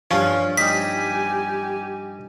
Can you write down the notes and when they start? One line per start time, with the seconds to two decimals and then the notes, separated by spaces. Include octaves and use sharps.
0.11 G2 F3 C#4 F4 C#5
0.57 G3 D#4 G4 G#5 B6